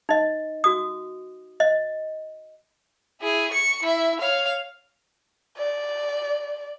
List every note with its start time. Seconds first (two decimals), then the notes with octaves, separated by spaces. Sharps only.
0.09 D#4 D#5
0.64 F#4 D#6
1.60 D#5
3.21 E4 G#4
3.52 C#6 C#7
3.82 E4 E5
4.20 C#5 F5
5.58 D5